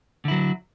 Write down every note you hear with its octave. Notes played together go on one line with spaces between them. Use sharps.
D3 F#3 E4